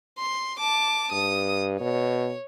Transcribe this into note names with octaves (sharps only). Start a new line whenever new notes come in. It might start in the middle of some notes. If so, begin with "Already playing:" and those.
C6
A5 D6
G2 D#6
B2 C#5